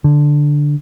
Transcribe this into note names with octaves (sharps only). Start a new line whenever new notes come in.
D3